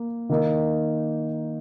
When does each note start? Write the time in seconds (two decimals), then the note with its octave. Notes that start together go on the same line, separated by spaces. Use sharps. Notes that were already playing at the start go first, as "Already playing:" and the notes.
Already playing: A#3
0.29 D#3 A#3 D#4